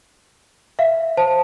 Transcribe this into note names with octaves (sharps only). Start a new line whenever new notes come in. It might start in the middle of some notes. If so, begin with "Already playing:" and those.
E5 F5
C5 A5